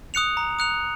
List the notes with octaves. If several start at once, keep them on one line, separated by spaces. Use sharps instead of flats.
D#6 F#6 C#7 F7
A#5
D#6 F#6 C#7 F7